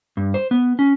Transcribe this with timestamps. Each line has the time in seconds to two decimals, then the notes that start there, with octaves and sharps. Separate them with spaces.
0.17 G2
0.34 C5
0.51 B3
0.79 C#4